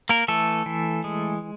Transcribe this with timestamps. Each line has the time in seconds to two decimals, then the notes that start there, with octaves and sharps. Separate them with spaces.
0.09 A#3 A#4
0.28 E3 A3 A4
0.66 E3
1.04 G#3